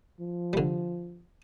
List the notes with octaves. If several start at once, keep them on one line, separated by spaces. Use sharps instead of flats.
F3
D3 G3